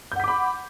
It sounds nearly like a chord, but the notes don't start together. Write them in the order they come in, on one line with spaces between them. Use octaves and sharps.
G6 F#5 B6 D6 B5